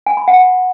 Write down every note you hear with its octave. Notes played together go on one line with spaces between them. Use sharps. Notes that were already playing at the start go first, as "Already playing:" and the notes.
G#5
B5
F#5